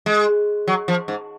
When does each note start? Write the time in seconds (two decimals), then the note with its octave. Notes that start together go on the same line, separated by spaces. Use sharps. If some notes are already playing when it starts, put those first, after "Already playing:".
0.06 G#3
0.67 F#3
0.88 F3
1.08 G#2